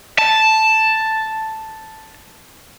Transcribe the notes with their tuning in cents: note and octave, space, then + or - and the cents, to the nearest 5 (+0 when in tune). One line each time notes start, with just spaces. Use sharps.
A5 +0